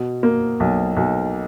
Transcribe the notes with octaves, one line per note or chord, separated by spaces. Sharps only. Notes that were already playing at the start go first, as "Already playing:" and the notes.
Already playing: B2
A#3
B1
B1